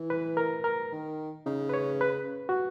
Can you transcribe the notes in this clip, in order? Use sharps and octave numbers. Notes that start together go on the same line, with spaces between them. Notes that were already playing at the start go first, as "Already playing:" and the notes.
Already playing: E3
B4
A#4
A#4
D#3
C#3 D#4
B4
C#5
B4
F#4